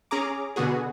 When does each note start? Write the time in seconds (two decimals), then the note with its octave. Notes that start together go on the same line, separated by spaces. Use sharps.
0.11 C#4 G#4 A#5 D6
0.56 B2 D3 B3 F#4 G#4